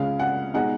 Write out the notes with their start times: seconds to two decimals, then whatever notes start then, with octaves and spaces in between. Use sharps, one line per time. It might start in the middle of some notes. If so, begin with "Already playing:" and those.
Already playing: C#2 C#3 G#3 C#4 F5
0.19 F#5
0.54 B2 G#3 D#4 F#5